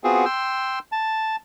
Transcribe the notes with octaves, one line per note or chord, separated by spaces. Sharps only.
B3 C4 F4 F#4 G#4
G5 C6 E6
A5